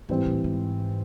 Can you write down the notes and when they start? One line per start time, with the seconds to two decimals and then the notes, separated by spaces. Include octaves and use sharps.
0.09 G#2 E3 G3 C4
0.26 A2
0.44 G#2